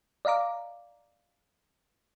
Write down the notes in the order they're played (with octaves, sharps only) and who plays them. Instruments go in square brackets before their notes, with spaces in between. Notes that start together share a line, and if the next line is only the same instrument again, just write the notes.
[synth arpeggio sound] D5 D#5 F5 A#5 D6